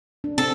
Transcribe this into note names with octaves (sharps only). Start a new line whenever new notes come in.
D4
C4 A4